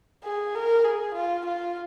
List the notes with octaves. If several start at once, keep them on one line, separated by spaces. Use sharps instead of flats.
G#4
A#4
G#4
F4
F4